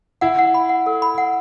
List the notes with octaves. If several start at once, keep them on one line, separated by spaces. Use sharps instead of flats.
E4 F#5
F#5
B5
F#5
A4
B5
F#5